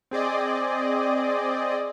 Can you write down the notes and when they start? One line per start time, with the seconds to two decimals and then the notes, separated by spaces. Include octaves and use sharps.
0.11 C4 G#4 D5 D#5